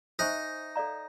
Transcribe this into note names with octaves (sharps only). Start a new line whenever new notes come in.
D#4 C5 E5 G#5 C#6
A4 D5 F5 A#5